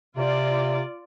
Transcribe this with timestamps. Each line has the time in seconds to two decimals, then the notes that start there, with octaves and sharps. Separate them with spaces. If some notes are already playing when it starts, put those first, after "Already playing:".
0.17 C3 F4 D5